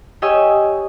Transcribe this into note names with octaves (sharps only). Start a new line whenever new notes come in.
G4 C#5 D#5 G#5 E6